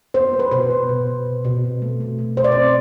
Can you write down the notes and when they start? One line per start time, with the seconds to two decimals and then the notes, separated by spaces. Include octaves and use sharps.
0.14 B3 C5
0.33 B3
0.39 B4
0.51 B2 C5
0.70 B3
0.89 B2
1.07 B2
1.26 B2
1.44 B2
1.64 C4
1.82 A3
2.00 B2
2.19 B2
2.37 B2 C5
2.44 D5
2.52 C4 C5